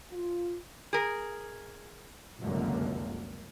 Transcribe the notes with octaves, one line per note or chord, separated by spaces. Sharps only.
F4
G#4 A#4
F1 C#2 F#2 D3 A#3